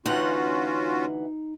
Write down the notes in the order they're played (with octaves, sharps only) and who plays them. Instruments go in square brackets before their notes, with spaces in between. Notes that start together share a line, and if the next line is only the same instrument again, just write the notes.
[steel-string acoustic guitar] D2 E3 F#5 [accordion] C#4 F4 F#4 [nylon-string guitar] D#4 G5